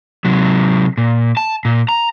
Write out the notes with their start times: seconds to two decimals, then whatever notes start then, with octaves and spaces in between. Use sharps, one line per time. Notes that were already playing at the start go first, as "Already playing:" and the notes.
0.25 C3 F#3
0.98 A#2
1.37 A5
1.65 A#2
1.89 A#5